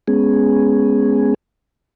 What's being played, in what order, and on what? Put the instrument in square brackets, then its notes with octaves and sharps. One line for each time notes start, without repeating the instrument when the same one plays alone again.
[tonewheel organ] G#3 B3 C#4 G#4